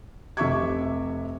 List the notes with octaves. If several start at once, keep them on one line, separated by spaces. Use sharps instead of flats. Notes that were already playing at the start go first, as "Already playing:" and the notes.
F1 C3 E5 C#6 D6 G#6